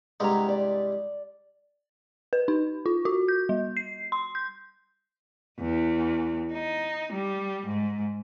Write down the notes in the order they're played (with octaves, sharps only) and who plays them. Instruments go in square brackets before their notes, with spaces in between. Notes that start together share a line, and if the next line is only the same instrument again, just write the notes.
[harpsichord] C2 G2 G#3 [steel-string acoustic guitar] F#5 A#5
[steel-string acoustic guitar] D5
[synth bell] B4
D#4
F4
F#4
G6
G3
C7
C6
G6
[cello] E2
D#4
G3
G#2